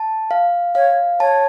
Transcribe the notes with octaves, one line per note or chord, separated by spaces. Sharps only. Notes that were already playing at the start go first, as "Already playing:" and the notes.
Already playing: A5
F5
C#5 F5
C#5 A5